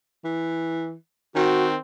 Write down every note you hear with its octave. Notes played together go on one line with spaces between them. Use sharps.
E3
D#3 C4 F#4